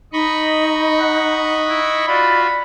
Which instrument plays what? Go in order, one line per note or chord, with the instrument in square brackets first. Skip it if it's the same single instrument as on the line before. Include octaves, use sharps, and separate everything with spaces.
[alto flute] D#4 [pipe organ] D#5 B5 C#6
[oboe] F#5
E4
[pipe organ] F4 F#4 [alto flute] D5 [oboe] B5